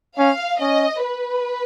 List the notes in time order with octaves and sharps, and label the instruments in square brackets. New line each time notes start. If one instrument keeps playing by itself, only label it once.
[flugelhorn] C#4 [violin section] F5
[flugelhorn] C#4 [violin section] D#5
[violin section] B4